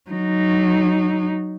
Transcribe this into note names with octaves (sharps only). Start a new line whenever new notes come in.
F#3 D#4